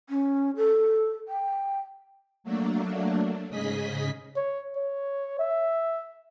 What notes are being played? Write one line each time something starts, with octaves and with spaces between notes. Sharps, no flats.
C#4
A4
G5
F#3 A3 A#3 D4
G#2 C#3 G#4 D#5 B6
C#5
C#5
E5